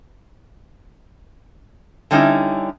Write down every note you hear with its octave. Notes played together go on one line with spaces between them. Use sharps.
D3 G3 C#4 D#4 E4